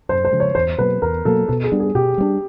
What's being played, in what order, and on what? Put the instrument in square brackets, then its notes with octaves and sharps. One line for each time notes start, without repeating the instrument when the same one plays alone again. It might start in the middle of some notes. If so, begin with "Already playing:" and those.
[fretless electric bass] F#2 [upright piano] C5
[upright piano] C5
[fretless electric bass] C#3 F3 G#3
[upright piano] C#5
[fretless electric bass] E2 [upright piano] C5
[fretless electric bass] B2 F#3 A#3 [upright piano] B4
[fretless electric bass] E2 [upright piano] A#4
[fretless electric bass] B2 F#3 A#3 [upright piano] A4
[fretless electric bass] B2 [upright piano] A4
[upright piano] G#4
[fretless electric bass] G3 B3 D4
[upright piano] G#4
[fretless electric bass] B2 [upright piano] G4
[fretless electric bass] G3 B3 D4